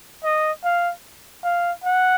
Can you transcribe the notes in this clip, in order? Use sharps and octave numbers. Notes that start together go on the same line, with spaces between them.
D#5
F5
F5
F#5